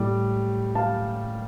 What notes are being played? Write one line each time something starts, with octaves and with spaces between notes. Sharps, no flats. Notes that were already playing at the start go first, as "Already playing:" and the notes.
Already playing: A2 G3
F5 A5